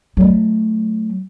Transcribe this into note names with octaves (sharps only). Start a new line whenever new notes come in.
F#3 A3